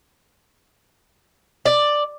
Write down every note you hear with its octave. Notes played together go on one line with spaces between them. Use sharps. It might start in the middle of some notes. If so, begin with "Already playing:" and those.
D5